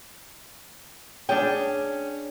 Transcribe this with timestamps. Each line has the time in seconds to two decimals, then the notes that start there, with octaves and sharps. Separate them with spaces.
1.29 C#4 D4 G#4 G5